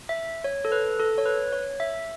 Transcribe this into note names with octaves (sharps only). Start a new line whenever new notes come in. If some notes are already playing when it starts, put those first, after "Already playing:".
E5
C#5
A4
B4
A4
C#5
B4
C#5
E5